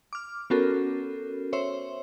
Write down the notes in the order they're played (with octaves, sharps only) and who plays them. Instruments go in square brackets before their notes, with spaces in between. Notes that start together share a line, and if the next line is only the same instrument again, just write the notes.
[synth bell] D6 F6
B3 C#4 F#4 A4 A#4
C5 C#5 E5 C6